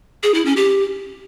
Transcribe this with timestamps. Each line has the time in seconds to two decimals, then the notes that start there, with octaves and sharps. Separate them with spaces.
0.23 G#4
0.34 E4
0.45 C#4
0.57 G4